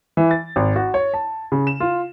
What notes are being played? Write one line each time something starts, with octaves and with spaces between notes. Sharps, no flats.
E3
A6
G#1
F#4
C#5
A5
C#3
E7
F4